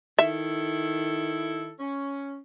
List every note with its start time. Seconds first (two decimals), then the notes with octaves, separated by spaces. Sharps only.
0.19 D#3 E4 A4 E5
1.80 C#4